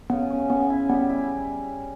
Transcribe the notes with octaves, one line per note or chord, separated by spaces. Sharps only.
C#3 B3
C#4
B3 C#4
E4
G3 B3
E4